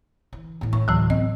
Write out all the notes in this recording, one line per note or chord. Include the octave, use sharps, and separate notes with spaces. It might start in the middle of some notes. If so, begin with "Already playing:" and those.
E3
A2 E3
A2 C#6
D2 A2 E3 F#3
C4 D#5